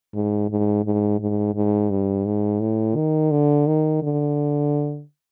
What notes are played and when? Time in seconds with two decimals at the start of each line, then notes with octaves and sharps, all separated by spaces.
0.14 G#2
0.50 G#2
0.85 G#2
1.19 G#2
1.55 G#2
1.90 G2
2.25 G#2
2.61 A2
2.96 D#3
3.31 D3
3.67 D#3
4.03 D3